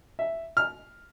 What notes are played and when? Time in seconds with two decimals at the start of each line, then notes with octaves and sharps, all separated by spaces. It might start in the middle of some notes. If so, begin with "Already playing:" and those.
0.19 E5
0.57 F6